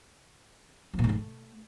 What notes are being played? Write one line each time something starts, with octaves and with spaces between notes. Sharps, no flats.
F3
A#2
G#2
A3